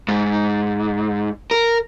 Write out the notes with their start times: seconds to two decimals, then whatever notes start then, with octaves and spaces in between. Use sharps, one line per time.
0.08 G#2
1.51 A#4